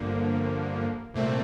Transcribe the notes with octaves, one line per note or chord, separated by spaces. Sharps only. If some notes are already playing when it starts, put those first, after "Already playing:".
Already playing: G1 G2 D3 F3 A#3
C2 A#2 A3 C4